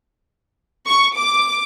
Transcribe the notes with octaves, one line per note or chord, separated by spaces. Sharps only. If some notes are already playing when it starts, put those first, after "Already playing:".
C#6
D6